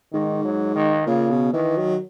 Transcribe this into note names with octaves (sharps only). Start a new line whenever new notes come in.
G#2 D#3
F#3
D#3
A#2 C#3
B2
D#3 E3
F#3